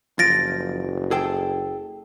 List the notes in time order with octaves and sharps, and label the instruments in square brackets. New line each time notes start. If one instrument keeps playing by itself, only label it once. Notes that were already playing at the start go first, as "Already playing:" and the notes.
[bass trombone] F#1 [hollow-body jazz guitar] F3 [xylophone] A6 A#6 D7
[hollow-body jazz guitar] G#4 A4 G5